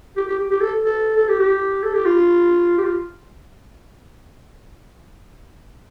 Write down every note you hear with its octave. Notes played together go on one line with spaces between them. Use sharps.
G4
G4
G4
G4
A4
A4
A4
G4
G4
A4
G4
F4
G4
F4